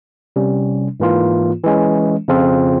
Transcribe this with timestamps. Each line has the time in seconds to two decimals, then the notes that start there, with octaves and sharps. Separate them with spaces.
0.36 C3 G3 C#4
1.00 G#2 E3 A#3 F4
1.63 E3 G#3 C#4
2.28 F2 C#3 F3 C4 F4